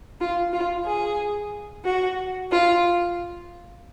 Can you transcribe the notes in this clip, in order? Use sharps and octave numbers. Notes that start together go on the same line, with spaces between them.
F4
F4
G#4
F#4
F4